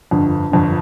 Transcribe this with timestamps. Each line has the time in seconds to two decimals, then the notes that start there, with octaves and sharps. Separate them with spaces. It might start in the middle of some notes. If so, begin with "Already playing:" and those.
0.11 G1 F2 D3
0.51 G1 F2 D3